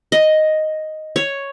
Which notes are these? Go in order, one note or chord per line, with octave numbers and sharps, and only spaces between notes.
D#5
C#5